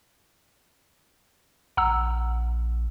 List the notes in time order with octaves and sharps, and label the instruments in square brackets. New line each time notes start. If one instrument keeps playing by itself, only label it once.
[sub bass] A#1 [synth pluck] F#5 A#5 E6